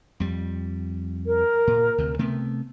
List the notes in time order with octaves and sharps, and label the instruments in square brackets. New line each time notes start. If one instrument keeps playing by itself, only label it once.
[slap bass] F2 G3
[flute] A#4
[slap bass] A#2
D2 C3
C3 A3 B3